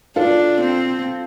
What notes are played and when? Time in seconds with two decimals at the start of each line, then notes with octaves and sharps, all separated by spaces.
0.16 D4 F4 A4
0.61 C4